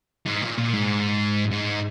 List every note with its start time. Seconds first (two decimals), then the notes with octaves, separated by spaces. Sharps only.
0.26 G#2
0.42 A#2
0.58 A#2
0.73 G#2
1.52 G#2